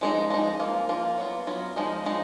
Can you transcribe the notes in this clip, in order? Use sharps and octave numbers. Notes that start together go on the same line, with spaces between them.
F3 G#3 D#4
F3 G#3 D#4
F3 A#3 F4
F3 A#3 F4
F#3 B3 F4
F#3 B3 F4
F3 G#3 D#4
F3 G#3 D#4